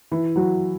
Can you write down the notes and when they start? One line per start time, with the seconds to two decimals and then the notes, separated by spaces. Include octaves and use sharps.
0.12 E3 E4
0.36 F#3 F#4